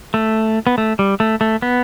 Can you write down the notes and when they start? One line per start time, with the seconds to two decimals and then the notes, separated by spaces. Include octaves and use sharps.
0.14 A3
0.67 B3
0.78 A3
0.99 G3
1.20 A3
1.41 A3
1.62 B3